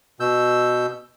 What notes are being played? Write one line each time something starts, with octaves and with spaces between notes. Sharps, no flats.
B2 E6 G6